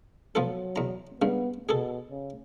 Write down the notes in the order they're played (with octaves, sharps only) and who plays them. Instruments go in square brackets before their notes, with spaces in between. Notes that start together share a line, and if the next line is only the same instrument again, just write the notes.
[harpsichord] F3 B3 A4 [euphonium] F#3
[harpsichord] E2 A#5
[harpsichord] G2 C#3 [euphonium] B3
[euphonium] B2 [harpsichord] G#4 A4
[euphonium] C#3